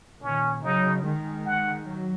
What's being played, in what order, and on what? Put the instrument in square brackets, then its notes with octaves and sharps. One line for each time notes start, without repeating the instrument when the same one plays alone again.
[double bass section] A#2 D#3 [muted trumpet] C#4
[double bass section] C#3 F#3 [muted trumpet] D#4
[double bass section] D#3 G#3
[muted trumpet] F#5
[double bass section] F#3